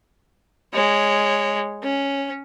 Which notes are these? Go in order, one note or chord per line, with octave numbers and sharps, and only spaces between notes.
G#3 C#5
C#4